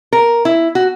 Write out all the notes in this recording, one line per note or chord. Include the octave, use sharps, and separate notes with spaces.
A#4
E4
F#4